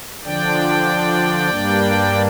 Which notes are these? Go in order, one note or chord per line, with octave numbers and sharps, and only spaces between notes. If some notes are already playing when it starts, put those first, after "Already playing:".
D3 F3 D4 D5 G5
G2 G3 A#3 D4